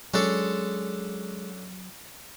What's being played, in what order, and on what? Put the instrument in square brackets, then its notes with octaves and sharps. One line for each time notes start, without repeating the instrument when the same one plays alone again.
[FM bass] F#3 [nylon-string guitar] G#3 [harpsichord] C#4 D4 A4